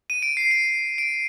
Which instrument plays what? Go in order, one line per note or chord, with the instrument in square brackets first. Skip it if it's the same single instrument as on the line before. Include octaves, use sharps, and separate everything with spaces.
[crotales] D#7
D7
C7
D7
D7